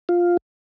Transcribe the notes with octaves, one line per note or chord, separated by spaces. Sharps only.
F4